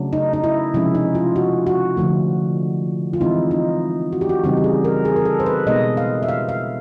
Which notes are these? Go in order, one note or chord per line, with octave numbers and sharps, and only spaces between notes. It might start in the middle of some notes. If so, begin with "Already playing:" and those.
Already playing: C#3 F#3 A3 D4
D#4
D#4
E4
C3 F3 G#3 C#4 E4
D#4
F4
F#4
F#4
D3 F3 A3
F4
E3 G#3 C4 D#4 E4
D#4
F#4
G4
F#4
C#3 E3 G3 C4 D#4 G4
G4
G#4
A#4
G#4
A#4
A4
C5
B4
B2 G#3 B3 D#4 D#5
F5
E5
F5
F5